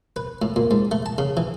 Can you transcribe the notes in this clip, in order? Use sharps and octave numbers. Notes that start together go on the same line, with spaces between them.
B4
A2
A#2
G#2
A3
A5
C#3
E3